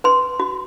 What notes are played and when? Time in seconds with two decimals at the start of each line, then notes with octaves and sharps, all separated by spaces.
0.04 B4 C6
0.40 F#4